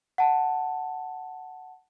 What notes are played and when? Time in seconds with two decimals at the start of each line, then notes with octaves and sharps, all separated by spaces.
0.18 F#5 A5